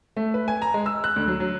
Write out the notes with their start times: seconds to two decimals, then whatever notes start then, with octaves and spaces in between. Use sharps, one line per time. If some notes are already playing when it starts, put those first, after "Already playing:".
0.17 A3
0.34 B4
0.48 G#5
0.62 A#5
0.74 G#3
0.86 E6
1.04 F#6
1.16 D2
1.28 F#3
1.40 F#3